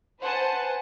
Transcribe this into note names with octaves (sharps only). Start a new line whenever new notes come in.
B4 C5 F#5 G#5 A5